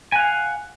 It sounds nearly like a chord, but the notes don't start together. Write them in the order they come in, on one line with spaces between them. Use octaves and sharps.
G#5 F#5 F5